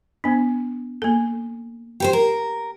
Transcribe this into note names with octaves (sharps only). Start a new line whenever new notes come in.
B3 D4
A#3 A4
G4 B4 C5
A#4